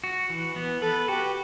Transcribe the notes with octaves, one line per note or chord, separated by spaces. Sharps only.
F#4
E3
B3
A4 B4
F#4 G4